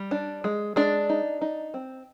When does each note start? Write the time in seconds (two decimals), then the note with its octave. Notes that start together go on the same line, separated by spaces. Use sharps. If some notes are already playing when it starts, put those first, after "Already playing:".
Already playing: G3
0.11 D4
0.44 G#3
0.76 G#3 D4 D5
1.09 D#4
1.41 D#4
1.74 C4